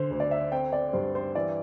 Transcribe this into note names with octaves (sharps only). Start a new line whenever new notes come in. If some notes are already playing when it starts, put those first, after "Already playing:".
Already playing: D3 C5
D2
D5
E5
C4 G5
D5
G2 C5
C5
E3 D5